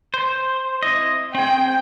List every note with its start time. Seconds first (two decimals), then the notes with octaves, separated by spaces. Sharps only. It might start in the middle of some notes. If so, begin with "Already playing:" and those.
0.14 C5
0.83 C4 E4 D#5
1.35 C4 G#4 G5